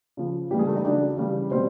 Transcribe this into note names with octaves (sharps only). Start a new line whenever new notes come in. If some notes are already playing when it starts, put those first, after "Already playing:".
C#3 F3
C#3 E3 G3 G4
G#3 G#4
A3 A4
D#4 D#5
C#3 F#3 D4 D5
C#3 E3 G3
B2 G3 C4 C5